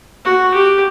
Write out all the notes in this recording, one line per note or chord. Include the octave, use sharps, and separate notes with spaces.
F#4
G4